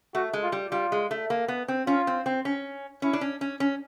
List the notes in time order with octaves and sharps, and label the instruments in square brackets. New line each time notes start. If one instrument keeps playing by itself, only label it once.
[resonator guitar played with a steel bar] A3 [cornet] F#4
[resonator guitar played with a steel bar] G#3
[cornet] F4
[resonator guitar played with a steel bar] G3
[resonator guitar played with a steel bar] G3 [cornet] F4
[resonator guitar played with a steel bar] G#3
A3
A#3
B3
C4
[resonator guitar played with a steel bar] C#4 [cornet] F4
[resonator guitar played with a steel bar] C4
C4
C#4
[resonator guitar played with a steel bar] C#4 [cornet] E4
[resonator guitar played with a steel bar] D4
C#4
C#4
C#4